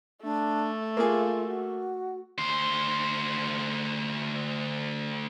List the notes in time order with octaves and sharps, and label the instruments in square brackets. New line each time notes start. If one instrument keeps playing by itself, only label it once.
[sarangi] A3 [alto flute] D4
[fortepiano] A#3 G#4 [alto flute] F4
[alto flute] F#4
[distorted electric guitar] D2 C5